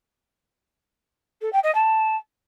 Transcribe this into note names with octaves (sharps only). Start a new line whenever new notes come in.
A4
G5
D#5
A5